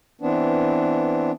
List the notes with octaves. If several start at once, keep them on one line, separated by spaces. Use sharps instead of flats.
E3 B3 C4 D4